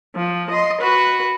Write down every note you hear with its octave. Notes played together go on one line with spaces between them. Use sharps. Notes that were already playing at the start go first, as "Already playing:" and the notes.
F3
D#5 C6
F#4 B4